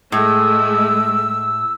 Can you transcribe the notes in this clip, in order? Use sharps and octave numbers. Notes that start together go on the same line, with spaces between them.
A2 G#3 A3 E6